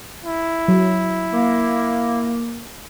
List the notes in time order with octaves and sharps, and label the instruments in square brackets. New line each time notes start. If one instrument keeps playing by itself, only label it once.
[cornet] E4
[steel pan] F#3
[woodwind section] A#3